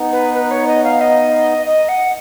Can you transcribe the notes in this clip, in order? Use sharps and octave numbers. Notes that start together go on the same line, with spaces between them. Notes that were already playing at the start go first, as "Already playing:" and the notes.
Already playing: B3 D#4
B4
B4
C#5
D#5
F5
D#5
D#5
F#5